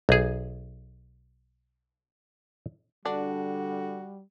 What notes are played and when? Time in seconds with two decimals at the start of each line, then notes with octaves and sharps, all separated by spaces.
0.09 B1 G#4
3.05 D3 G3 D4 F#4